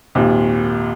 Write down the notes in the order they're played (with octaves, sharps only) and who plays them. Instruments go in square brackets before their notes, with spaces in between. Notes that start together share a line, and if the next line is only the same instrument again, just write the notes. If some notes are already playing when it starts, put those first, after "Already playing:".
[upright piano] G#1 D#2 A#2